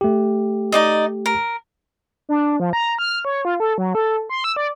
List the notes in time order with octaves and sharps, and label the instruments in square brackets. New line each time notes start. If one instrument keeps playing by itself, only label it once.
[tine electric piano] A3 G4
[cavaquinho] D#4 D5 D#5
A#4
[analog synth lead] D4
F3
A#5
F6
C#5
F4
A4
F#3
A4
C6
E6
D5